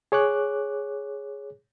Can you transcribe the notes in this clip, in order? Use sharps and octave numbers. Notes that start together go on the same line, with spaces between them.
G#4 C#5 D6 F#6